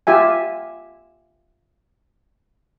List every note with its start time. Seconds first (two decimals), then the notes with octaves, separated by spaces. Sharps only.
0.07 F4 G4 E5 G#5